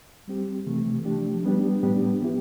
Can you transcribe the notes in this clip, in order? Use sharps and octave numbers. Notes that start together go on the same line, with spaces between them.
G3 C4 G4
C3 E3 A3
F3 A3 D4 G4
G3 B3 D4 G4
A2 G3 B3 D4 G4
F3 B3 E4 G4